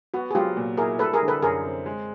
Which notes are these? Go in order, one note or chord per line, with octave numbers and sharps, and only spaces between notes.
B3 F#4
G#4
F#3 F4 G4
A#2
E4 G#4 A#4
G3 A4 B4
G#4 A#4
D3
A4 B4
F#2 G#4 A#4
C4
G#3